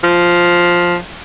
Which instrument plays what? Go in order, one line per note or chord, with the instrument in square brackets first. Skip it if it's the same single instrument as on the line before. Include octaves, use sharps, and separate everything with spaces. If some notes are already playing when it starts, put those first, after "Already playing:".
[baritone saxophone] F3